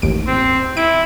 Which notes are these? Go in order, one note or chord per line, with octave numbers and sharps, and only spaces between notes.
A1 D#2 D7
C4
E4 D7